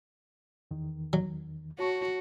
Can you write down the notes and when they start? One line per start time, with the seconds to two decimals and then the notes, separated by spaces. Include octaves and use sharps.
0.71 E2 D#3
1.13 F#3
1.79 F#4 C#5 A5 C#6